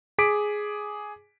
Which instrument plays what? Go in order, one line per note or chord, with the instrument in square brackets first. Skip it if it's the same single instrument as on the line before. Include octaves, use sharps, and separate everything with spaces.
[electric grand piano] G#4 D6 B6 D7